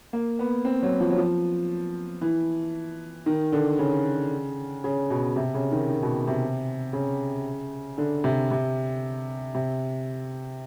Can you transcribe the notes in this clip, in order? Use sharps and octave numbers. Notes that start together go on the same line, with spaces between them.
A#3
B3
C4
F#3
F3
F#3
F3
E3
D#3
D3
C#3
C#3
B2
C3
C#3
D#3
D#3
B2
C3
C#3
D3
C3
C3
C3